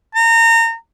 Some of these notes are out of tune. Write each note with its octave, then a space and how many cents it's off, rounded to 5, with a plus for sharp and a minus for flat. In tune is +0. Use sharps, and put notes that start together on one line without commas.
A#5 -30